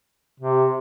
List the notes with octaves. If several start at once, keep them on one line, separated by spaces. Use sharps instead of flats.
C3